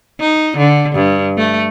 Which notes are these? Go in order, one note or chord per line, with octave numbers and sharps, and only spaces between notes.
D#4
D3
G2
A3